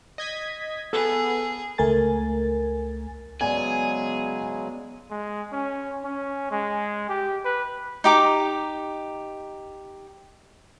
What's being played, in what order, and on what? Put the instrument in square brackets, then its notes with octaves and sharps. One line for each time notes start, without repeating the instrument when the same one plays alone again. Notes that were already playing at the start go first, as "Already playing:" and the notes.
[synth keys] D#5 G#6 B6
[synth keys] B3 [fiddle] G#4 [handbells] A4
[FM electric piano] C#2 A3 A#4 G#5 A6
[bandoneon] C#3 F#3 G#3 [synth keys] B3 D5 [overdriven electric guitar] G#4 [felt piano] G#5
[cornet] G#3
C#4
C#4
G#3
G4
B4
[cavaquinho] D#4 G4 A#5 D6